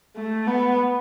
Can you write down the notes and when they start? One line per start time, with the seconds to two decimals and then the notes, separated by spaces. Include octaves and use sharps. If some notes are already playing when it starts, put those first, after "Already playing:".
0.16 A3
0.47 B3